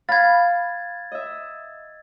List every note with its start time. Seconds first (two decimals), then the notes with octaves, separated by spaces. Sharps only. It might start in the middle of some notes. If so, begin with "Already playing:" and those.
0.09 F5 B5 G#6 A6
1.12 D#5 E5